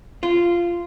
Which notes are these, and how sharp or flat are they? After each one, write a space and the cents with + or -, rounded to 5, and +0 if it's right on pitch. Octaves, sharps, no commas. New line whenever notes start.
F4 -15